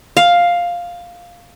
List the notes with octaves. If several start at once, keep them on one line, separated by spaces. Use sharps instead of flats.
F5